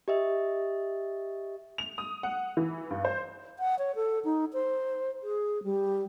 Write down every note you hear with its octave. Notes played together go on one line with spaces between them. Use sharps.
G4 D#5 E5
F7
D#6
F#5
E3
G2
C5
F#5
C#5
A4
D#4
C5
G#4
G3